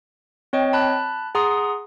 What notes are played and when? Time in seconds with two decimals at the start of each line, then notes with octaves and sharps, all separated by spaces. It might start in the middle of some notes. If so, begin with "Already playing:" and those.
0.53 C4 C#5 D#5 G5
0.73 A5 B5 F#6
1.35 G#4 F#5 A#5 C6 D#6